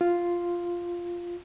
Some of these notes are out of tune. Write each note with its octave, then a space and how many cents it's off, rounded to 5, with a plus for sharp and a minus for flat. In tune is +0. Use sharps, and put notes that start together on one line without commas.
F4 -5